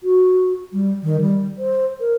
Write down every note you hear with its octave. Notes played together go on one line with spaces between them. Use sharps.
F#4
G3
D#3
G3
C5
A#4